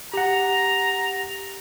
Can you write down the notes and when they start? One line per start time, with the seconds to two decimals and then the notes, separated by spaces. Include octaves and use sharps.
0.14 G4 F#5 A#5